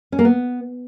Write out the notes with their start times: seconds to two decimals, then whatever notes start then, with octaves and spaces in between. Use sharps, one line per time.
0.12 C#4
0.19 A#3
0.25 B3